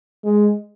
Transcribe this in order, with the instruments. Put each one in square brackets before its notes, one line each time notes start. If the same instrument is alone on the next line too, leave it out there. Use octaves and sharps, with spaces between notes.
[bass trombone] G#3